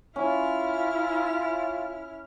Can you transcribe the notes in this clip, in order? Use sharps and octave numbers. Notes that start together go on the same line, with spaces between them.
C#4 E4 F4 F6